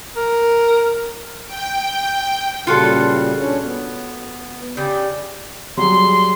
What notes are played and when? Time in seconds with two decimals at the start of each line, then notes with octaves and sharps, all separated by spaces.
0.16 A#4
1.46 G5
2.67 A#2 C#3 G3 F4 F#4 A4
3.40 C#4 D4 C#5
3.63 B3
4.77 C#3 G4 D5
5.77 F#3 G3 G#4 C6